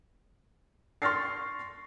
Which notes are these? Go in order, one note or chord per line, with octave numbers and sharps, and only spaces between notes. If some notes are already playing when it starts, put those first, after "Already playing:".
C6 C#6 F6 A6 A#6 C7